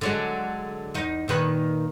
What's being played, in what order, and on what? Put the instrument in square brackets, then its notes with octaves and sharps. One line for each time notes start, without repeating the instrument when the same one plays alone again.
[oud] D3 F#3 G#3
E2 D#4
A#2 D#3 B4